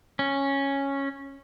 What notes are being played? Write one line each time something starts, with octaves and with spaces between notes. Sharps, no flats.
C#4